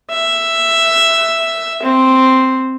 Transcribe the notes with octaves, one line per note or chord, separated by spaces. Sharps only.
E5
C4